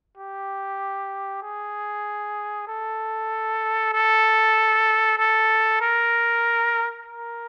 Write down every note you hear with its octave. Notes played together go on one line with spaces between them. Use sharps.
G4
G#4
A4
A4
A4
A#4
A#4